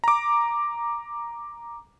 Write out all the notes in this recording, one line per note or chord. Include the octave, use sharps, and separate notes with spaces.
A#5 D6